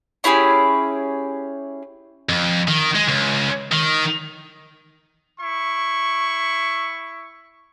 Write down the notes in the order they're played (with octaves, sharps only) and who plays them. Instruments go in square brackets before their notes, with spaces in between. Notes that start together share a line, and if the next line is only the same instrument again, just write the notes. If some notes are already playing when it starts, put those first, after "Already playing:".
[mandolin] C#4 E4 G4 G#4
[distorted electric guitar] F2
D#3
G#3
C#2
D#3
[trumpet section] E4 C#6